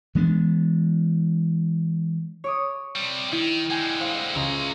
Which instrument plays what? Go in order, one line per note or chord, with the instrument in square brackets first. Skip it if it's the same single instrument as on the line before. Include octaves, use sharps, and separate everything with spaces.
[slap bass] E3 G#3 B3 D4
[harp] C#5 D6 D#6
[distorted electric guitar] C3 G3
[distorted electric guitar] D#3 [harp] E4
[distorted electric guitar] D3 G#3 [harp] G5 G#5
[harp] C5 F5 C#7
[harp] C#2 [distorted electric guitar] E4 A#5